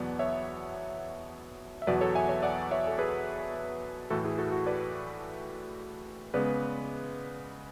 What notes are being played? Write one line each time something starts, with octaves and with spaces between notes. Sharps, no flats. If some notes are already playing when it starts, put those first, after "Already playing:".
Already playing: E2 B2 F#3 B3 D5
C#5 E5
E5
E2 B2 F#3 B3 B4 D5
A4 C#5
E5 G#5
C#5 E5
D5 F#5
C#5 E5
A4
G#4 B4
A2 E3 A3 F#4 A4
E4 G#4
F#4 A4
F#4
B4 D5
C#3 G#3 B3 B4 D5